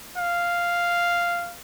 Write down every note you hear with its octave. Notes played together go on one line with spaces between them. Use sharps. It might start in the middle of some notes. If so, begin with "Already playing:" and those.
F5